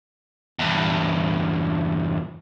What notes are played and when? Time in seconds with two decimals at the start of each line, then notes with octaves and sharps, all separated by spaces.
0.59 E2 G2